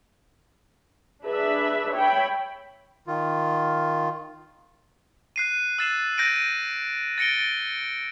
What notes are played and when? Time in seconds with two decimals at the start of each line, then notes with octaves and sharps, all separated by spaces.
1.23 D4 G#4 B4 E5
1.92 C#5 E5 G5 B5
3.07 D#3 F4
5.36 F#6 C7 D#7
5.78 E6 F#6 A6 C7 E7
6.18 G6 A#6 D7 D#7
7.18 A6 A#6 C#7 D7 G7